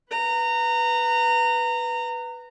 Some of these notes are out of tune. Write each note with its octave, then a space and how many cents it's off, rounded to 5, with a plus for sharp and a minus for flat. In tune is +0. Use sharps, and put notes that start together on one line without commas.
B4 +0 A#5 -25